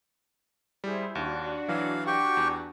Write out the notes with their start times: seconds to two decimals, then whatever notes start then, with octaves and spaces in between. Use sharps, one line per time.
0.84 G3 E4 G#4 C5
1.15 D#2 D4 F#4
1.68 E3 F#3 F5
2.07 G4 G5 C#6
2.37 E2